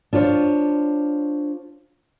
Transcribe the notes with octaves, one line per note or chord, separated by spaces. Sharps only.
D4 F4 C5 C#5